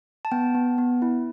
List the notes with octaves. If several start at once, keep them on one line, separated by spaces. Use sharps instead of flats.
A5
B3 G5
B3
B3
E4